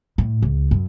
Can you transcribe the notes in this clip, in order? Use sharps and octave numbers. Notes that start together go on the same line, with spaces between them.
A2
C#2
F#2